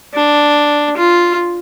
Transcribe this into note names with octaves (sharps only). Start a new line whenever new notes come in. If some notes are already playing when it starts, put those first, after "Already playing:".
D4
F4